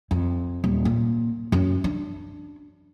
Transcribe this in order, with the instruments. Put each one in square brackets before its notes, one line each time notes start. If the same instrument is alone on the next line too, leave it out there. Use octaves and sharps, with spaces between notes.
[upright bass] F2
D#1
A#2
F#2
D4